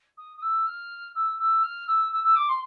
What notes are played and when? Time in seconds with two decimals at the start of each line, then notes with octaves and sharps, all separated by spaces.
0.17 D#6
0.37 D#6
0.42 E6
0.66 F6
1.15 E6
1.39 E6
1.63 F6
1.87 E6
2.12 E6
2.23 E6
2.35 D6
2.48 C6